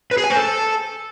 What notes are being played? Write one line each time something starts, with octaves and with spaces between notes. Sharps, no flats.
B4
G#4
G#5
C5
A4